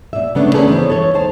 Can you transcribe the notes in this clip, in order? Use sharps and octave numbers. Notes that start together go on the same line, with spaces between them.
A#2 E5
C#3 A3 B3 D4
A3 A#3 C#4 D4 G#4 B4
E3 B3 C5 C#5
A4 C#5
D#2 D#3 C5 A5